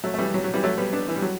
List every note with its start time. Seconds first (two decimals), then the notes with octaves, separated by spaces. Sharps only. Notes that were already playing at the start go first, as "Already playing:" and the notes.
0.04 F#3 A3
0.14 A3
0.18 E3 G3
0.34 F#3
0.44 F#3
0.54 E3 G3
0.64 F#3 A3
0.78 G3 B3
0.93 B3 D4
1.08 E3
1.16 G3
1.22 F#3